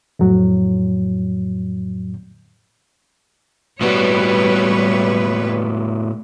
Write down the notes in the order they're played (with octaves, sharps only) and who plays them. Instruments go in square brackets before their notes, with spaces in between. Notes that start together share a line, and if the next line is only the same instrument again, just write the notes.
[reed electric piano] F2 A2 F#3
[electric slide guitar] A2 B3 F#4 [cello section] G3 B4 C#5